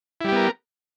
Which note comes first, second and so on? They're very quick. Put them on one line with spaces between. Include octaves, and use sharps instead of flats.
E4 G3 G4 B3 A#4